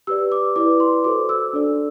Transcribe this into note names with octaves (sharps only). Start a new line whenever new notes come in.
G4 B4 D5 E6
D6
E4 B4 D5 D6
C6
F#4 A4 C5 D6
E6
D4 A4 D5